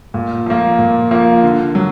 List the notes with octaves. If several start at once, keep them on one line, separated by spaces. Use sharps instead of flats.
A#2
F3 A#3
A#2
F3 A#3
D3
F#3